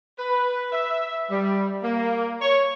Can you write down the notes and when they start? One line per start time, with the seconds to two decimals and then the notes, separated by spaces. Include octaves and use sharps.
0.19 B4
0.72 E5
1.30 G3
1.83 A#3
2.41 C#5